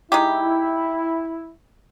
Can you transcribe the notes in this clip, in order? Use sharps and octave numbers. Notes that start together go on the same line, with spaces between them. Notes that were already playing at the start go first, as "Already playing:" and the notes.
G#3 D#4 E4 G4